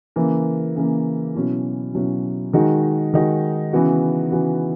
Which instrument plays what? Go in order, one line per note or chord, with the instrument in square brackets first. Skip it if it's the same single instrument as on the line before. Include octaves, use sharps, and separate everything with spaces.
[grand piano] C#3 E3 A#3
C#3 E3 A#3
B2 F#3 C#4 E4
B2 F#3 C#4 E4
D#3 G#3 D#4 F#4
D#3 G#3 D#4 F#4
C#3 E3 B3 F#4
C#3 E3 B3 F#4